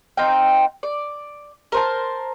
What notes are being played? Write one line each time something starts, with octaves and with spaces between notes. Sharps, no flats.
C4 D#4 F5 G5
D5
A#4 C5 A5